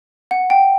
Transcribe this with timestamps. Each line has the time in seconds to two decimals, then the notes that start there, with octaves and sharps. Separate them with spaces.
0.31 F#5
0.50 G5